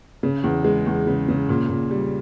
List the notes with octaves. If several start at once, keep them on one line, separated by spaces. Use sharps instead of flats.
C#3
E2
G#3
E2
C#3
C#3
A#2
A#2
G3